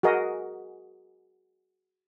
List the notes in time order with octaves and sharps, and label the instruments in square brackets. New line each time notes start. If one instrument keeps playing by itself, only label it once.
[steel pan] F#4 G#4 A#4 D#5